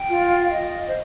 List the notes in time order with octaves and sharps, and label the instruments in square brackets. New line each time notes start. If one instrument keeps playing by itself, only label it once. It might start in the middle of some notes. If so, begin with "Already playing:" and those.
Already playing: [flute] G5
[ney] F4
[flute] F5
D#5
C5